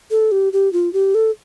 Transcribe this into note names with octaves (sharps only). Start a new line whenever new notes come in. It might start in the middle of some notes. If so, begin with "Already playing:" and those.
A4
G4
G4
F4
G4
A4